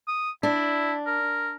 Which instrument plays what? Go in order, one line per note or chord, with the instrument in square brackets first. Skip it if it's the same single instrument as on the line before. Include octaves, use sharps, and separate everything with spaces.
[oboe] D#6
[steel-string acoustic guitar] D4 [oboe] E4
[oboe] A#4